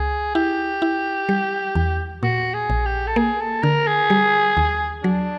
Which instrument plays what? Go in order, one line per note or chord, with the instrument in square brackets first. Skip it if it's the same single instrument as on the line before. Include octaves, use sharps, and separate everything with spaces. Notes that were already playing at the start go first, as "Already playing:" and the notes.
Already playing: [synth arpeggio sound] C#2 [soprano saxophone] G#4
[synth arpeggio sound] E4 [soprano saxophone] G4
[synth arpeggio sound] E4
G3
E2
[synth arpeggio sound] A#2 [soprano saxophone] F#4
[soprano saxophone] G#4
[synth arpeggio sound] A#1
[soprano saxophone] G4
A4
[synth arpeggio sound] A#3 [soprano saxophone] G#4
[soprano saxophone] A4
[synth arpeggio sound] D3 [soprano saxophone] A#4
[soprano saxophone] G#4
[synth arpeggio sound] G3
D#2
[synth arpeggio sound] F#3 [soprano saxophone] D4